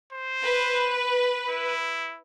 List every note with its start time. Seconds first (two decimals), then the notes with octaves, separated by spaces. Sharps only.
0.13 C5
0.42 B4
1.49 E4